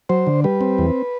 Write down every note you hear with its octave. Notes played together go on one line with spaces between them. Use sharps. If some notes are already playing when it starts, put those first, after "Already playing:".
F#3 C5
D3
G3 B4
C4
E2